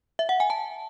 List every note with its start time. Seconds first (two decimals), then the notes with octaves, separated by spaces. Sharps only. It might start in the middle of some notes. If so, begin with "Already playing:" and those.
0.19 E5
0.29 F#5
0.40 G#5
0.50 A5